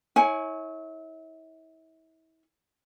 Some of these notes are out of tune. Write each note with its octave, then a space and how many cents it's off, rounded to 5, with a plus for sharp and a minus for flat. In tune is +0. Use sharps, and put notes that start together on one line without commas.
E4 -35 C#5 -10 G#5 +10